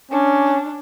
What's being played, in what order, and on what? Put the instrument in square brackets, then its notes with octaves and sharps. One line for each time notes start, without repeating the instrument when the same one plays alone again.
[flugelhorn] C#4 [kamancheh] D4